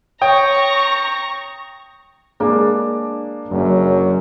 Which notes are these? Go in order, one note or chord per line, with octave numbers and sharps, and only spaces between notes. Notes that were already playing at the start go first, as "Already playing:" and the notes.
C#5 G5 A#5 C#6 D#6
G#3 A#3 D4 G#4
F#1 F#2